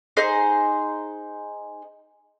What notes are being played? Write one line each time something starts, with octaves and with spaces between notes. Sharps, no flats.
D#4 G#4 C5